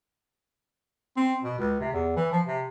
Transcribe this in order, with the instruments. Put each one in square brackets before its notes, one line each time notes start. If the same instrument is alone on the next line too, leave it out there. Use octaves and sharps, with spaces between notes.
[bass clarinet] C4
B2
C#2
C3
E2
E3
F3
C3